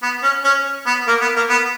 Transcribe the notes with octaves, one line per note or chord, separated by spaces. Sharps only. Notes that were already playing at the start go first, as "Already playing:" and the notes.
B3
C#4
C#4
B3
A#3
B3
A#3
B3